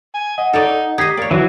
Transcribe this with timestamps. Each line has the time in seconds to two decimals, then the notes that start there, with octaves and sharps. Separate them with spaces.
0.14 G#5
0.38 D#5 F#5
0.53 D#4 A4 C#5 D5
0.98 D#4 G4 D#5 G#6 B6 C7
1.17 A#3 C#5 D5
1.31 E3 F#3 E4 F#4